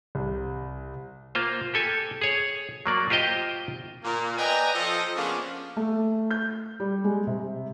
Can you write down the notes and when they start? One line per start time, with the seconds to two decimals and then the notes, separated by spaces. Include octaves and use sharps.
0.15 C2
1.35 A#3 F4 C5
1.74 G4 A4 G#5
2.22 G#4 C#5
2.86 F#3 A#3 D5
3.10 F4 G4 C5 D#5 G5
4.03 A#2 A#3
4.37 B4 D5 D#5 G5 G#5 A#5
4.73 F3 A4 D#5
5.16 C#3 F3 A#3 B3 C#4 D4
5.77 A3
6.31 G6
6.80 G3
7.04 G#3
7.27 C3